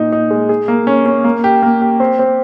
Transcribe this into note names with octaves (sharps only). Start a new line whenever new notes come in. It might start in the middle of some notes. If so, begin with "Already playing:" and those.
Already playing: A#2 D#4
D#4
G#3
G#4
A#3
C#4
C#4
A#3
G4
A#3
G4
C4
C4